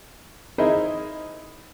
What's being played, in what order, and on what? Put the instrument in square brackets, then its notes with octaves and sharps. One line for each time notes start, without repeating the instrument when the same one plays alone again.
[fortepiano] D#4 E4 G#4 A#4 C5 D#5